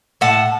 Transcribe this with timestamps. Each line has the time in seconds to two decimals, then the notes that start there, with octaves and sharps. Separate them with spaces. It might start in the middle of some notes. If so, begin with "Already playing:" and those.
0.21 A2 F#5 A5